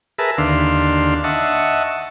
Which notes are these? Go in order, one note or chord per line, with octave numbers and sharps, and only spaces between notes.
G#4 A#4 B4 E5 A5
D#2 D3 D4 F5 C6
D#5 E5 F#5 A5 C#6